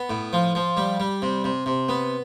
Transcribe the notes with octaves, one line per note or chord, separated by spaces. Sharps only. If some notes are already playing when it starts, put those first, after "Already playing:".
Already playing: B3
A2
F3
F3
G3
G3
C3
C3
C3
B3